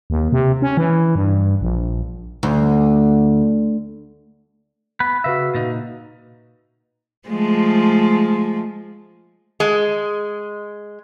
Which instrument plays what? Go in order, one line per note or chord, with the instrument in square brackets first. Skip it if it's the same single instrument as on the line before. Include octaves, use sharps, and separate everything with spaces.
[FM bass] D#2
C3
C#4
E3
G2
A#1
[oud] D2
[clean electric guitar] B3 B4
[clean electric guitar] C#3 E5 [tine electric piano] F#4 B4 F5
[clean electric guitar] A#2 D#4
[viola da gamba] F3 G#3 A3
[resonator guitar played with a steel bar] G#3